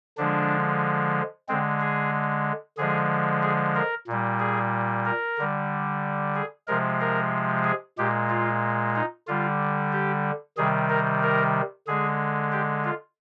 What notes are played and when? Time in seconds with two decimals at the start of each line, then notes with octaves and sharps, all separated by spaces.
0.18 D3 F3 G#3 D4
1.49 D3 G#3 C4
1.81 G#4
2.78 D3 F3 G#3 G#4
3.43 G#4
3.75 A#4
4.07 A#2 G3
4.40 G#4
5.06 A#4
5.38 D3 G3
6.36 G#4
6.68 C3 F3 G#3 A#4
7.01 A#4
7.65 G#4
7.98 A#2 G#3 G4
8.30 F4
8.95 D#4
9.27 D3 G3 F4
9.93 G4
10.57 C3 D#3 G3 G#4
10.90 A#4
11.23 A#4
11.87 D3 G#3 G#4
12.52 G4
12.84 F4